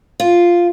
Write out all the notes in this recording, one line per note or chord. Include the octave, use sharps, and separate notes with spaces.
F4